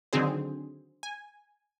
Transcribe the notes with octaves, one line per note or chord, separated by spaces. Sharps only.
D3 D#3 F#3 C4 G#4 C5
G#5